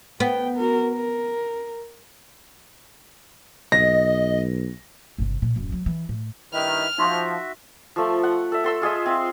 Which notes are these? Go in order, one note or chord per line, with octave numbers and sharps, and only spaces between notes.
B3 G5
F#4 A#4
A#4
B1 D#5 A#6
G1 C3
A#2
D1 F#2
F#3
E3
A2
G2 D#3 E4 B4 F6
F3 D#4 F#4 E5 C6 C#6
F3 A3
F#5
A4 E5
A4 C6 E6
F4 G#4 D#5 E5
C4 F4